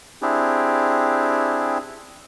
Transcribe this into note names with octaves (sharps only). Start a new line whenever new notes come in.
C4 D4 E4 G4 G#4